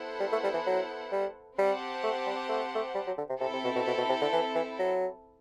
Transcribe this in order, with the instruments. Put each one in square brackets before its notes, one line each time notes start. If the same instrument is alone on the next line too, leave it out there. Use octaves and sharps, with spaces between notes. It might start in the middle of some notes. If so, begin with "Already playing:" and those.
Already playing: [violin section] B3 E4 A4 C5 F#5
[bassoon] G3
A3
G3
E3
F#3
G3
[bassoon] G3 [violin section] C4 G4 C5 F#5 A5
[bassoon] A3
G3
A3
A3
G3
F#3
D3
C3
[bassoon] C3 [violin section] C4 E4 A4
[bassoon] C3
B2
B2
B2
B2
C3
D3
E3
E3
F#3